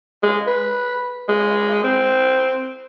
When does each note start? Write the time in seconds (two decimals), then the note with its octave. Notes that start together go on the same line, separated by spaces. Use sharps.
0.23 G#3
0.47 B4
1.29 G#3
1.84 C4